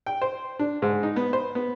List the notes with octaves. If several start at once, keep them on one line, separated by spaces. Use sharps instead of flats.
G5
C5
D4
G#2
D#4
B3
C5
B3